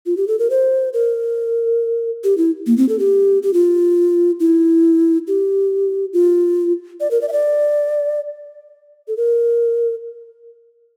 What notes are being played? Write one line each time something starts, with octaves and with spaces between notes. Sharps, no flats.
F4
G4
A4
A#4
C5
A#4
G4
E4
A#3
C4
A4
G4
G4
F4
E4
G4
F4
D5
A#4
D5
E5
D5
A4
A#4